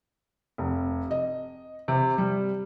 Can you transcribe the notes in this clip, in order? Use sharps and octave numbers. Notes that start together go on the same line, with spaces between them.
F1
D#5
C3
G3